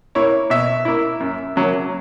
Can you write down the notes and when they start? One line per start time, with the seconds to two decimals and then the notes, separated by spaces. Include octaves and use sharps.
0.15 A#3 E4 C#5
0.50 B2 E5
0.85 A#3 E4
1.20 F#2
1.56 C#3 F#3 A#3